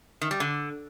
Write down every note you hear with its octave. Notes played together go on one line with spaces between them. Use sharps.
D#3
G3
D3